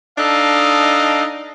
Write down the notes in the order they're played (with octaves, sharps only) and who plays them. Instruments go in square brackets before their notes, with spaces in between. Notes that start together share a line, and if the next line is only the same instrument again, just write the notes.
[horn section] D4 D#4 A4 D#5 F5